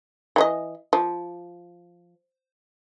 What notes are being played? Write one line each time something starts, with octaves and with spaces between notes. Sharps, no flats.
E3 D#4 D#5
F3